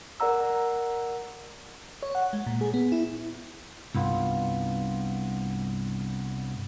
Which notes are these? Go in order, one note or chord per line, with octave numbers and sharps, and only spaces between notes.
A#4 D5 F#5 A#5 E6
C#5
F#5
G#3
A#2
G#4
B3
E4
C2 G2 B3 F4